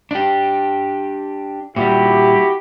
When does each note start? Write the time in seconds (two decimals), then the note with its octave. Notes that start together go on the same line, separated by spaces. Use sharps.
0.11 D4 G4
1.76 A#2 G3 E4 F#4 G4